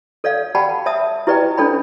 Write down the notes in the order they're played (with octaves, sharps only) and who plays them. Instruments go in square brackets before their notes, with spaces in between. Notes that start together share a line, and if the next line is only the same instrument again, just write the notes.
[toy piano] A4 C#5 D5 F5
G4 D5 F#5 G5 A5 B5
C#5 E5 A5 D#6
E4 G4 B4 D5 D#5 G5
C#4 D4 A4 C#5 G5 B5